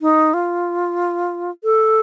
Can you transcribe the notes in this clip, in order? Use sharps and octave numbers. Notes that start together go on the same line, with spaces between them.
D#4
F4
A4